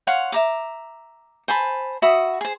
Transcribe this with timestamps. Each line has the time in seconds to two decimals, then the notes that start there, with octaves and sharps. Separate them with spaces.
0.07 C#5 F5 F#5 C6
0.32 E5 A#5 D6
1.48 C5 G#5 A5 B5
2.02 F#4 E5 B5 D#6
2.41 G#4 C5